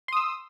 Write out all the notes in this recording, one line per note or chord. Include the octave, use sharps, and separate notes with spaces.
C6 D#6 E6